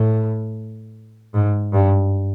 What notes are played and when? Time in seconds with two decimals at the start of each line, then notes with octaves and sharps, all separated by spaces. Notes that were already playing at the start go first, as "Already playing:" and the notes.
Already playing: A2
1.34 G#2
1.73 G2